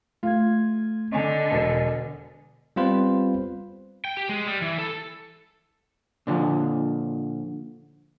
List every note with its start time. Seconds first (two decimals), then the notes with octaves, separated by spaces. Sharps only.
0.23 A3 F4 G#6
1.12 D3 D#5 G#5
1.51 E1
2.76 G3 B3 C4 F4 B4 C5
4.05 G5
4.17 G4
4.29 G#3
4.47 G3
4.62 E3
4.78 A4
6.27 A#2 D3 E3 F3